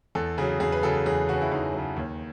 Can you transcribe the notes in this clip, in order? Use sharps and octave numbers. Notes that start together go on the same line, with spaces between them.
E2 A4
C#3 F#3 G#4
E2 G#4
B4
C#3 F#3 A4
E2 G#4
C#3 F#3 F#4
E4
E2 D#4
F#3
C#3
D#2